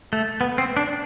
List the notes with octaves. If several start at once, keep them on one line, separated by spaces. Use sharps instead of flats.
A3
B3
C4
D4